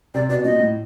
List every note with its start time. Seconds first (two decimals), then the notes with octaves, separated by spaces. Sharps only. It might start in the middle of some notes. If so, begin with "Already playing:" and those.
0.14 C3 D5
0.29 B2 D5
0.45 A#2 D#5
0.59 A2